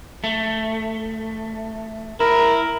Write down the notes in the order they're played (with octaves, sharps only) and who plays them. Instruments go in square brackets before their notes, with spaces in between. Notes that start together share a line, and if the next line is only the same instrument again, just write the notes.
[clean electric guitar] A3
[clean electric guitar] E4 [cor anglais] A#4